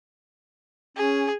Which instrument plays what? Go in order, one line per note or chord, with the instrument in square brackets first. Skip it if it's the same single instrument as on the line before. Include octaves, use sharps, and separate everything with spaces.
[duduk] C#4 [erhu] G#4